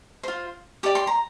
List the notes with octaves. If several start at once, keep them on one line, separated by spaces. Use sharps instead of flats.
F4 C5
G4 D5 D6
C6
A#5